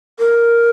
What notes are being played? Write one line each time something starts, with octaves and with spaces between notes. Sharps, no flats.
A#4